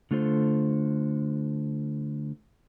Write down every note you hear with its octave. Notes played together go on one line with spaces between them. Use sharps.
D3 A3 F4 A4 C5